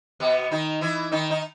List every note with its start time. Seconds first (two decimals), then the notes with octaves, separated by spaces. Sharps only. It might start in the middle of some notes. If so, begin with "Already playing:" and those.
0.20 B2 B3
0.51 D#3 D#4
0.81 E3 E4
1.12 D#3 D#4
1.30 D#4